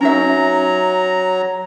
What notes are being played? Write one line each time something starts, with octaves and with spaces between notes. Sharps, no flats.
F#3 C#4 D#4 E5 A#5